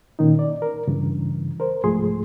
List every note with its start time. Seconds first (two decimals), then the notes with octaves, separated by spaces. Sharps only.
0.19 A#2 D#3 C#4 D#4
0.39 D5
0.62 A#4
0.87 G2 C#3 E3
1.60 A#4 C5
1.84 C2 G#2 F3 A3 G#4 C6